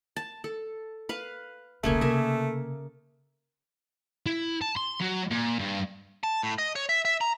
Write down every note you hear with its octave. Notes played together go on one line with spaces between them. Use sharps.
A5
A4
B4 F5
E1 C2 C#3 A3 A#3 G#5
C3 A#3 A#4 E5
E4
A5
C6
F#3
A#2
G2
A5
A2
D#5
C#5
E5
E5
A#5